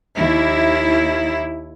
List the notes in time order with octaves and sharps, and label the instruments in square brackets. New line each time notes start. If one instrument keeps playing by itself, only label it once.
[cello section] D#2 E4